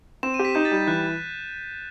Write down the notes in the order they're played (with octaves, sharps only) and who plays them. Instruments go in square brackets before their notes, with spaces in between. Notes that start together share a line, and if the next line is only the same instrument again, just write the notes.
[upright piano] C4 [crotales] E7
[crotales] D#7
[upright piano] G4
[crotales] B6
[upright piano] D#4 [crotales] G6
[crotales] A6
[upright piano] G3 [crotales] G6
[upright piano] E3 [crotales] F#6